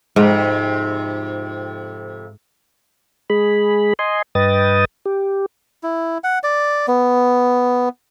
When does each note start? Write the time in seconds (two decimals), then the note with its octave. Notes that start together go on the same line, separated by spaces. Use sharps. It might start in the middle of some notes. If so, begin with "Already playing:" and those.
0.16 F2 G#2 C3
3.30 G#3 G#4 B5
3.99 D#5 G#5 C6
4.35 G2 B4 D#5 G5 D#6 A6
5.06 G4
5.83 E4
6.24 F#5
6.43 D5
6.88 B3